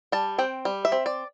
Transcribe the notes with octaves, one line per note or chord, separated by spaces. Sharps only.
G3 A5
C4 G5
G3
E5
C4
D5